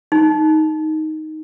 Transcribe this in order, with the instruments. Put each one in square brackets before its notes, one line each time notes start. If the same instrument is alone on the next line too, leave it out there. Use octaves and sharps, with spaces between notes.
[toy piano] D#4